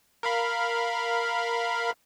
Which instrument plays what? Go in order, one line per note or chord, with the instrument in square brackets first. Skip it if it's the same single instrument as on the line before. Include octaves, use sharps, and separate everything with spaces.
[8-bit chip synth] A#4 F5 B5